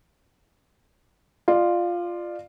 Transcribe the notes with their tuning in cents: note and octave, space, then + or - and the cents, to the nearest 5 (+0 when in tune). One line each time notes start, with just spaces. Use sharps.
F4 +0 D5 +30